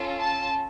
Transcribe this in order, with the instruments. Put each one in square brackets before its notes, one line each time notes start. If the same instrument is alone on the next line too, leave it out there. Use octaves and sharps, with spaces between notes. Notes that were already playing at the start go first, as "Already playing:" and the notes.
Already playing: [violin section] C#4 F4 A4
A5